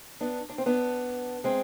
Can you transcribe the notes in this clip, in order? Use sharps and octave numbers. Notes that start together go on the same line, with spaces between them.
B3 D4
D4
C4
B3 D4
G#3 C4